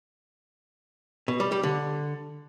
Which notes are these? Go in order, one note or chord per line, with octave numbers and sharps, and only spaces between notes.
B2
G3
G3
D3